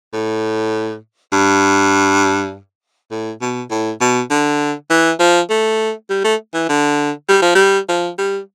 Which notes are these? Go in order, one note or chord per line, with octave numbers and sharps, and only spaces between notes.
A2
G2
A2
B2
A2
B2
D3
E3
F3
A3
G3
A3
E3
D3
G3
F3
G3
F3
G3